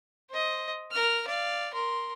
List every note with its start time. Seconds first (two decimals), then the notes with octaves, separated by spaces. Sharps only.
0.30 C5 D#5
0.92 A#4 F6
1.27 D5 F5
1.73 A#4 C6